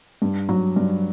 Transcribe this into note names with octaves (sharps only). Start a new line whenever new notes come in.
G2
F#3
G2